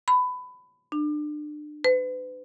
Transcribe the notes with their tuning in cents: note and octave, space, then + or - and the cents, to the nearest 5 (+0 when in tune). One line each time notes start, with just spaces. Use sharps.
B5 +20
D4 +30
B4 +40